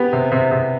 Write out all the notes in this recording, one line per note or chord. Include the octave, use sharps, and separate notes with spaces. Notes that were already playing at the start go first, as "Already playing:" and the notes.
Already playing: B3 G4
C3
C3
C3